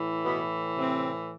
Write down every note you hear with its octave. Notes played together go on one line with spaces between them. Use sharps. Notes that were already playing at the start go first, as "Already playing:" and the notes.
Already playing: A2 E3
B2 B3
C3 C4